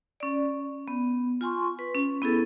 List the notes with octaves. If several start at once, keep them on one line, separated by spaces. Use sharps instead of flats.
C#4 D5
B3
F4 G#5 C6 C#6
B4
C#4
B3 E4 G#4 A4